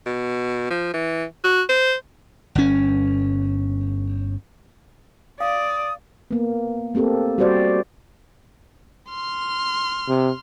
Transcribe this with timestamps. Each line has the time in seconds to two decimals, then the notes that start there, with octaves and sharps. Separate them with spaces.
0.06 B2
0.70 F3
0.94 E3
1.44 F#4
1.69 C5
2.55 G1 C#4
5.40 D5 F5 D#6
6.31 A#3 B3
6.94 A3 A#3 C4 G4 A4
7.38 G3 F#4 G4 C5 D5
9.09 C6 F6
10.08 C3